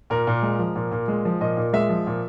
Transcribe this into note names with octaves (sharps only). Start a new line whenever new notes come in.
A#2 A#4
A#2
G#3
F3
A#2
A#2
G#3
F3
A#2 D#5
A#2
G#3 E5
F3
A#2